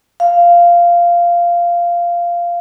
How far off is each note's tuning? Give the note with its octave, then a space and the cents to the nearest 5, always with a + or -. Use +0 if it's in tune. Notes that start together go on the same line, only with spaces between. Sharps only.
F5 -10